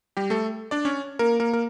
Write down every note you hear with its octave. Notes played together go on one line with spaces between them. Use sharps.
G3 G4
A3 A4
D4 D5
C#4 C#5
A#3 A#4
A#3 A#4
A#4